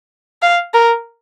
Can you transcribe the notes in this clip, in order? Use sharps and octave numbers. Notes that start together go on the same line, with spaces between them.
F5
A#4